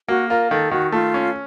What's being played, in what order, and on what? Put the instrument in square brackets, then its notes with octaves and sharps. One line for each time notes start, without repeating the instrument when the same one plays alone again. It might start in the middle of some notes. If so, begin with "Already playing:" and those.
[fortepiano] A#3 [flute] F#4
[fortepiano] F4 [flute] A#4
[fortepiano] D#3 [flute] A4
[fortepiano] D#3 [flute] F#4
[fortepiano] A3 [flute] F4
[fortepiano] C#4